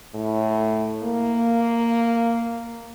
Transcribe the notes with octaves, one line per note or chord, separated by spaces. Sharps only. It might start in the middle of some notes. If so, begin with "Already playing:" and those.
A2
A#3